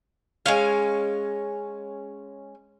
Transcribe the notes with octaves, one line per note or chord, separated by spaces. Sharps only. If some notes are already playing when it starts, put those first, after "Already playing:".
G#3 C#4 F5